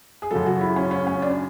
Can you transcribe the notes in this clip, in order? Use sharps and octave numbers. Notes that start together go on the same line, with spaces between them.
G#4
F#2 C#3 F#3 A4
F#4
E4
C#4
C#4
C#4
D4